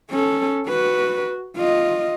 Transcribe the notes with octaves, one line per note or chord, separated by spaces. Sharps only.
C#4 A4
F#4 B4
F4 D#5